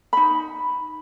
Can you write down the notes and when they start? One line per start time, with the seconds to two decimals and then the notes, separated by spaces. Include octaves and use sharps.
0.13 D#4 B5